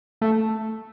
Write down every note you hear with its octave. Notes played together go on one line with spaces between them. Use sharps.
A3